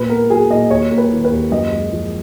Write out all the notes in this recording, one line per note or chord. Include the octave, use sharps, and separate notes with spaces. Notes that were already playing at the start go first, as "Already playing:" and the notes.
Already playing: A#2 B4
B3 A#4
F#3 G#4
A#2 D#5
D#2 C#5
A#3
B4
D#3
B4
D#2
F#2 D#5
G#3
F3